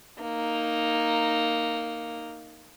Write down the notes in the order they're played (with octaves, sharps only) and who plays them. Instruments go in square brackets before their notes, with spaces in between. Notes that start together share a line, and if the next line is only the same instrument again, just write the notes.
[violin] A#3 D#4